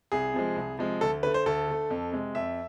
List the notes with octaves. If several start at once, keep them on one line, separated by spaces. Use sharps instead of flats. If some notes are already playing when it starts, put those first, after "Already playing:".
C2 G#4
C3 F3 G#3
C2
C3 F3 G#3
D2 A4
D3 A3 B4
C5
D2 A4
D3 A3
F2
C3 G#3
F2 E5